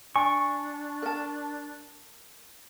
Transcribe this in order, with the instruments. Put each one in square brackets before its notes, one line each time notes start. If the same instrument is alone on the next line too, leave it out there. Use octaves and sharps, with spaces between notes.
[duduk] D4 [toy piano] G#5 [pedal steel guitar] C#6
[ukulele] A#4 A5